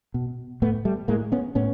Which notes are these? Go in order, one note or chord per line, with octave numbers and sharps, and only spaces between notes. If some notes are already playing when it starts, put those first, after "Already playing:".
B2
A2 A3 B3
G3 A3
A2 G#3 A#3
B3 C#4
A2 B3 C#4